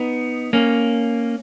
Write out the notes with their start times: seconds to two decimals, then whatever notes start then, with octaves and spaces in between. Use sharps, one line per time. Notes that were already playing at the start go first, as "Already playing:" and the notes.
Already playing: B3 D#4
0.53 A#3 C#4